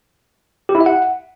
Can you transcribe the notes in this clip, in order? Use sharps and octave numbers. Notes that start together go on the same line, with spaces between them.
G4
E4
E5
F#5